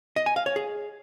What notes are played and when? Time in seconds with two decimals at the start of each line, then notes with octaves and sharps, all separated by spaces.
0.16 D#5
0.26 G#5
0.36 F5
0.46 C#5
0.56 G#4